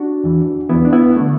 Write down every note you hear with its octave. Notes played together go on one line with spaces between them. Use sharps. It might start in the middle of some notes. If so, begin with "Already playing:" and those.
Already playing: D4 F#4
E2 E3
E2 E3 B3 E4
D4
B3 E4
D3 A3